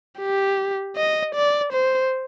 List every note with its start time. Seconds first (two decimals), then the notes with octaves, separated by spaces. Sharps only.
0.20 G4
0.96 D#5
1.35 D5
1.73 C5